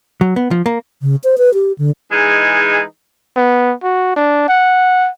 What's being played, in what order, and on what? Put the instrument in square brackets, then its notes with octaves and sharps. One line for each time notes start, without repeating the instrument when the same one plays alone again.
[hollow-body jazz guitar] F#3
B3
F3
A#3
[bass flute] C#3
C5
B4
G4
D3
[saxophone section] E3 G#3 D#4 G#4
[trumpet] B3
F#4
D4
F#5